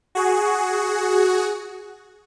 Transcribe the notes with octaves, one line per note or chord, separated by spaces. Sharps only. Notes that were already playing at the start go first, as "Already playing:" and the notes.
F#4 G#4